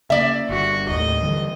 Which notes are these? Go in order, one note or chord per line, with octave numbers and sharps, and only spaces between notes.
C#3 A#3 D5 E5
G1 F#4
D#2 A2 D#5
D3 E3 G3